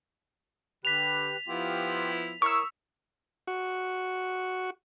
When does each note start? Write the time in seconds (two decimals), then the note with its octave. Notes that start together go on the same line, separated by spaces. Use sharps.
0.85 D3 G4 B4 B6 F7
1.48 F3 B3 E4 F4 G4
2.42 E4 A#4 C#5 C#6 D#6 E6
3.47 F#4